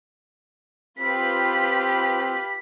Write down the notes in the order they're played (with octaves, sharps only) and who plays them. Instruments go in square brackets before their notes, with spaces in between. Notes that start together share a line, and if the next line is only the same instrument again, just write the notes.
[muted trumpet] C4 [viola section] F4 B4 B5 [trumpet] G4 [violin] B6